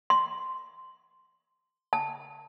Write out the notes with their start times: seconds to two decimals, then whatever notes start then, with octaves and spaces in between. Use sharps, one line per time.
0.10 C6
1.93 A5